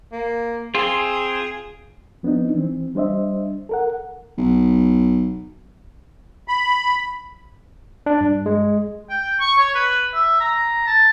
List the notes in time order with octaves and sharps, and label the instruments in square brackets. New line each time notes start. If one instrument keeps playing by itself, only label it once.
[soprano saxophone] A#3
[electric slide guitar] C4 F4 [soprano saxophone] G#4
[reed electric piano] F3 B3 C4 D4 D#4
E3 C4
G3 D4 C5 D#5 E5
A4 A#4 F#5
[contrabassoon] B1
[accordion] B5
[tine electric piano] D4
G2
G#3
[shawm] G5
C#6
C#5
B4
E5
A#5
A5